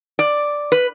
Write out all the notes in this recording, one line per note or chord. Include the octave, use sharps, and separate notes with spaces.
D5
B4